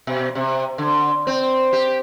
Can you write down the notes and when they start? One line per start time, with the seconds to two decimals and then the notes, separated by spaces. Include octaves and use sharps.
0.07 B2
0.35 C3
0.78 D3
1.27 C4
1.73 G4